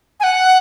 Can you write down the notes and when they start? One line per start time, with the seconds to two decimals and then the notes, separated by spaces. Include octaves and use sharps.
0.20 G#5
0.24 F#5